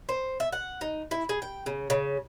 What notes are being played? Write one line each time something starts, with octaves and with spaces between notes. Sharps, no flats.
C5
E5
F#5
D#4
E4
G#4
G5
C#3
C#3